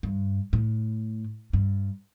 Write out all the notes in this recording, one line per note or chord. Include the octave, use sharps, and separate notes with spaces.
G2
A2
G2